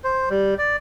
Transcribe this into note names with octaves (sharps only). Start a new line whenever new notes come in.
C5
G3
D5